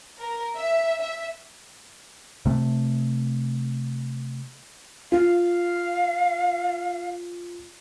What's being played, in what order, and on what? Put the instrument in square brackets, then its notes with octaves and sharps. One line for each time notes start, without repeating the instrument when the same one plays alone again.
[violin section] A#4
E5
E5
[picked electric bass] C3 A3
[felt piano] F4 [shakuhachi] F5